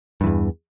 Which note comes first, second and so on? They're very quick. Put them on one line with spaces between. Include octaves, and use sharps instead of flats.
G2 E3 E2